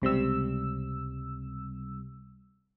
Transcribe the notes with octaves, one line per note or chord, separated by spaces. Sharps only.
C#2 C3 G3 E6